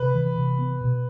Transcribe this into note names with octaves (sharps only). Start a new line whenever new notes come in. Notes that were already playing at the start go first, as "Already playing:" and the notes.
Already playing: C3 B4
E3
C3
B3
B2